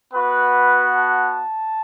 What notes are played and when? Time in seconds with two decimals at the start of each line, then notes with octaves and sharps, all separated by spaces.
0.12 B3 F#4 B4
0.94 A5